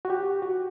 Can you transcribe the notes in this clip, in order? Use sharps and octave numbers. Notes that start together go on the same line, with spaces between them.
F#4
G4
F#4